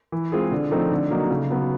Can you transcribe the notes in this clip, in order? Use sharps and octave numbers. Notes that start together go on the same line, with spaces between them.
E3
G#3 C4 F4 G#4
D3
F3 A3 C4 D#4
D3
F#3 A#3 D#4
C#3
F#3 B3